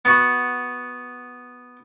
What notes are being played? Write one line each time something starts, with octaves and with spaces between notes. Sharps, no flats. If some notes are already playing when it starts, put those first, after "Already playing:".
B3 F#4